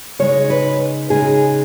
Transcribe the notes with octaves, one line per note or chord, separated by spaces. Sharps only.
C#3 G#3 D#4 C#5
B4
C#3 G#3 D#4 G#4